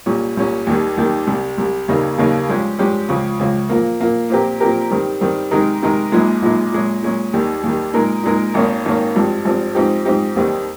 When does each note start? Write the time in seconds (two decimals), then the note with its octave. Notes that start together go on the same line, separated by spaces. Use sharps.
0.06 C2 A#2 G3 C#4
0.37 C2 A#2 G3 C#4
0.67 D#2 D#3 G3
0.97 D#2 D#3 G3
1.27 C2 C3 G3
1.58 C2 C3 G3
1.88 D#2 C#3 G3 A#3 D#4
2.18 D#2 C#3 G3 A#3 D#4
2.49 G2 F3 G#3 C#4 G4
2.79 G2 F3 G#3 C#4 G4
3.09 C#2 C#3 F3
3.39 C#2 C#3 F3
3.69 A#2 F3 A#3
4.00 A#2 F3 A#3
4.30 A#2 F3 C4 G4 A#4
4.60 A#2 F3 C4 G4 A#4
4.91 G2 D#3 G3 C4
5.21 G2 D#3 G3 C4
5.51 C3 D#3 G#3 D#4 A#4
5.82 C3 D#3 G#3 D#4 A#4
6.12 A#1 A#2 F3 G#3 D#4
6.42 A#1 A#2 F3 G#3 D#4
6.72 A#2 G#3 C#4
7.02 A#2 G#3 C#4
7.33 D#2 D#3 G3
7.63 D#2 D#3 G3
7.93 A#2 G#3 D#4 A#4
8.23 A#2 G#3 D#4 A#4
8.54 G#1 G#2 D#3 A#3 C#4
8.85 G#1 G#2 D#3 A#3 C#4
9.15 G#1 G2 F3 C4
9.44 G#1 G2 F3 C4
9.75 G#2 F3 C4 D#4 G4
10.05 G#2 F3 C4 D#4 G4
10.36 D#2 D#3 G3 C4 D#4